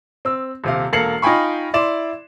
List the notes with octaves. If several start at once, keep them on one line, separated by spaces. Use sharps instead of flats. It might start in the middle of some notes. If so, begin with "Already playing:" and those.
C4 E6
D#1 C3 F5
E1 A#3 A4 C7 C#7 F#7
D#4 F4 G5 G#5 B5 C#6
E4 D5 C6 E7